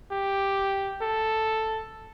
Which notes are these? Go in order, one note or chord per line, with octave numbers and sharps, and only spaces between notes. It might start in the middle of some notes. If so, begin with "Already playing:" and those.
G4
A4